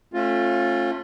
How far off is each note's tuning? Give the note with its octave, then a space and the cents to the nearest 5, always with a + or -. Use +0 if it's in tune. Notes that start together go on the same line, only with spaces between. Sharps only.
A3 +0 C#4 -35 F4 +10